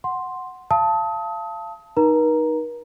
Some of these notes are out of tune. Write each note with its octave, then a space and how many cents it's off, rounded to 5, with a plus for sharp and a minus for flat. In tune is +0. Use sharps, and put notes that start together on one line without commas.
F#5 +0 C6 +0
F5 -30 A5 +0 D#6 +35
D#4 -5 A#4 +45 A#5 +0